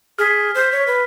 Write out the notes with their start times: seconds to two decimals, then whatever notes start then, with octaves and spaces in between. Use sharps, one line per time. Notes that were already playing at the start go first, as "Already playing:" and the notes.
0.19 G#4 F6 B6
0.55 C5
0.72 C#5
0.87 B4